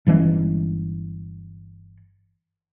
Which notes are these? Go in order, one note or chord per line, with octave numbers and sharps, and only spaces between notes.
G1 E3 G#3 C#4